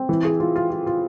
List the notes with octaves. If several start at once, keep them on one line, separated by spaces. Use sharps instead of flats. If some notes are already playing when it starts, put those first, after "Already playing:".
Already playing: C4
E3
G#4
F4
F4
F4
F4